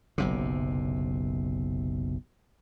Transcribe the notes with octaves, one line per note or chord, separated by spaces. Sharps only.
F#1 B1 C3